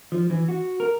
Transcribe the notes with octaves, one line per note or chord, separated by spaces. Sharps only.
F3
E3
F#4
A#4